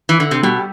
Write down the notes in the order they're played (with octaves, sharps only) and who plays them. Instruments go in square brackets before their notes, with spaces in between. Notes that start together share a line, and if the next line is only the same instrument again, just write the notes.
[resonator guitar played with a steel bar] E3
D3
C3
[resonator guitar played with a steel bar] B2 [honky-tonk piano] G3